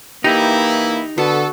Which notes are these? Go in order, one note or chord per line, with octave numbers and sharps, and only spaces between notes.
E3 A#3 D#4 E4 G4
D3 B3 F#4 A4